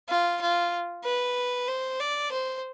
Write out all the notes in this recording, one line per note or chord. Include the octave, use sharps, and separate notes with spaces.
F4
F4
B4
C5
D5
C5